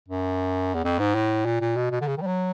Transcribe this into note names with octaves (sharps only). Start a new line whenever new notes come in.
F#2
E2
F2
G#2
A2
A#2
A#2
B2
B2
D3
C#3
D#3
G3
F#3